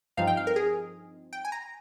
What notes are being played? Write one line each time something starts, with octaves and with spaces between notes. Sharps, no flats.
G2 F3 C4 D#4 F5
G5
F5
A#4
G#4
G5
G#5
A#5